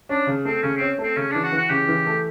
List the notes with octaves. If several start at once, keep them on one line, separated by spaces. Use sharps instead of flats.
C#4 D4
C#3
A3 C4
C#3 C#4
C4 C#4
A3 C4
C#3 C#4
E3 D4
F#4
E3
F#4
C#3 G4
E3
A3